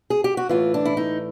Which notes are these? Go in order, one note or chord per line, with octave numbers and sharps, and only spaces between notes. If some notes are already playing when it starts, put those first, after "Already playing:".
G#4
G4
F#4
A2 E3 F4
D4
E4
D#4